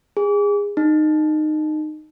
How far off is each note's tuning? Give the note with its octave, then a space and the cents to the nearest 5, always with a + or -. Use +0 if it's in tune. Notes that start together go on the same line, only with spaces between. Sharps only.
G#4 -25
D#4 -20